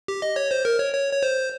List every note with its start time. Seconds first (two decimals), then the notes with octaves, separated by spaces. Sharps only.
0.08 G4
0.22 D#5
0.36 C#5
0.51 C5
0.65 A#4
0.79 C#5
0.94 C#5
1.13 C#5
1.23 C5